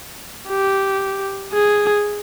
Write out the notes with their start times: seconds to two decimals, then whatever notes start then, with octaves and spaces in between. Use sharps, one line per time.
0.49 G4
1.53 G#4